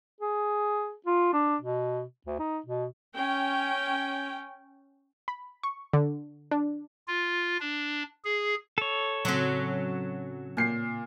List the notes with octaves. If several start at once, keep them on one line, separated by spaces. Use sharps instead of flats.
G#4
F4
D4
B2
D2
D#4
B2
C#4 G5
B5
C#6
D3
D4
F4
D4
G#4
A4 C#5
A2 C#3 F#3 C4 C#4
A#2 G6 G#6 C7